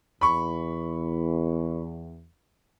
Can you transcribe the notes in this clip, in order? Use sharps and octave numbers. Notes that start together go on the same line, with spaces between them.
E2 B5 C#6